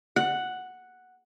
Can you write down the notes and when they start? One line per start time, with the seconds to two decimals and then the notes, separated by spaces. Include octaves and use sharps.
0.16 F#5